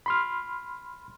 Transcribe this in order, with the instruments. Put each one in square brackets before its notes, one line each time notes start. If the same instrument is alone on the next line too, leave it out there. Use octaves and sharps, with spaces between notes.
[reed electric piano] B5 C6 F6